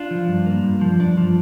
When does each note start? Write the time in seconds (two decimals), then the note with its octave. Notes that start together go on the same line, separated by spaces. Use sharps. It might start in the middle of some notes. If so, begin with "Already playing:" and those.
Already playing: D4 F4
0.11 F3
0.28 G2
0.46 A#3
0.64 G2
0.81 F3
0.99 G2 D4
1.17 F3